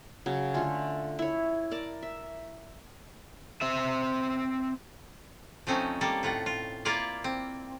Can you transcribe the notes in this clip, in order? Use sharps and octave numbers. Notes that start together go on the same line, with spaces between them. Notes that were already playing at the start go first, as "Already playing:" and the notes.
C#3 F#3
D3 A3 C#4 F4
E4 C#5
A#4 D5 A5
E5
C4 E5
F3 A3 C4 C#4 D#4
G3 A#3 A4
A2 F4 F#5
F4
A#3 E4 F4 D5 F5
C4